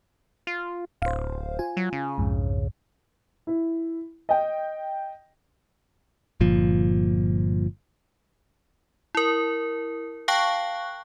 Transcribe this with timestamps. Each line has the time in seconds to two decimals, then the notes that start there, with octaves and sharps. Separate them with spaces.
0.47 F4
1.02 D1 C5 F5
1.59 F4 G#5
1.77 F#3
1.93 C#3
2.18 B1 F2 G#2
3.47 E4
4.29 D#5 G5
6.41 G1 A#2 F3
9.15 E4 A#4
10.28 F5 G5 A5 C#6 F#6